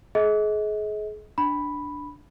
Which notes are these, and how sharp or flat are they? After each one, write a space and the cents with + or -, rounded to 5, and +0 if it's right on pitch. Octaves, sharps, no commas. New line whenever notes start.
G#4 +35 D#5 +35
D4 +0 B5 +0